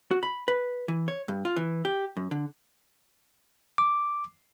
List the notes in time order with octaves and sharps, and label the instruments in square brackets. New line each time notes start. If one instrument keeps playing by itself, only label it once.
[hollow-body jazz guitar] F#4
B5
B4
E3
C#5
G2
F4
E3
G4
F#2
D3
[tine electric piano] D6